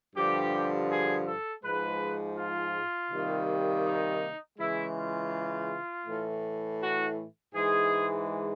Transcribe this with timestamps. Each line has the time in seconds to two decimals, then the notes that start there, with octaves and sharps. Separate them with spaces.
0.16 G2 D3 F3 G4
0.90 G#4
1.27 A4
1.63 G#2 F3 G#3 B4
2.38 F4
3.11 C3 D#3 G3 A#3
3.85 D#4
4.59 C#3 E3 G#3 E4
4.96 F4
6.07 A2 E3 A3
6.81 F#4
7.55 G#2 E3 G#3 G#4